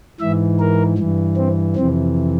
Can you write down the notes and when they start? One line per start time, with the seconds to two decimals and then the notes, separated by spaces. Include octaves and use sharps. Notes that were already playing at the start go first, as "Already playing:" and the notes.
0.20 G#2 E3 E5
0.59 A#4
0.98 G2 E3
1.37 C4
1.76 F2 C3 E3 C4